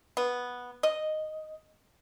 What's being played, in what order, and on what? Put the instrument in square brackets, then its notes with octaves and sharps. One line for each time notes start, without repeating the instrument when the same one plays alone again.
[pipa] B3
D#5